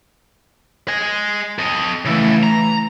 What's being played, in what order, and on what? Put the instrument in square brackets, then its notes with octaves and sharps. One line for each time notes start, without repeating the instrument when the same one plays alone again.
[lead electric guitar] D#5 G#5
A4 D#5
[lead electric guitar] C#3 E4 [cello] E3 A3
[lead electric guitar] A#5